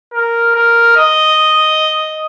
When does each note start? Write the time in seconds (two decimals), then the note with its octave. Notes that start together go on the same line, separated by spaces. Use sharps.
0.14 A#4
0.55 A#4
0.97 D#5